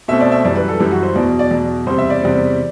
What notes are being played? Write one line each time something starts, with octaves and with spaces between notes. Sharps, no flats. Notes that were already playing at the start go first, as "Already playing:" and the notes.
B2 A3 C4 E5
D5
E5
F#2 E3 G3 D5
B4
A4
F#2 E3 G3 G4
F#4
C5
E2 B2 F#3 D5
D5
E2 B2 F#3
E2 C3 G3 C4 C5
E5
D5
E2 C3 G3 C4